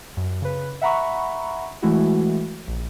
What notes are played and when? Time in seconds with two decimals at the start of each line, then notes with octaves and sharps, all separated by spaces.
0.17 F#2
0.42 C#3 B4
0.81 E5 F#5 A#5 B5 C#6
1.82 E3 G#3 A3 E4 F#4
2.68 A#1